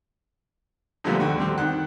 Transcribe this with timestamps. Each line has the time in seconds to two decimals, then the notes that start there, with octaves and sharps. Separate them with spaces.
1.04 A#2 D3 F3 G3 A3 B3
1.20 D#2 D3 F#4
1.38 G3 C4 G4
1.58 D#3 F#5 F#6